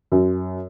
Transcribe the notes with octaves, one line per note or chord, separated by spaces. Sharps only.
F#2